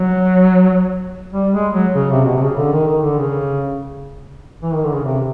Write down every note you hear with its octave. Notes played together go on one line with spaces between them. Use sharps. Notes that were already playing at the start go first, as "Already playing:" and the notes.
Already playing: F#3
G3
G#3
F#3
C#3
C3
B2
C3
C#3
D3
D#3
D#3
D3
C#3
E3
D#3
D3
C#3
C3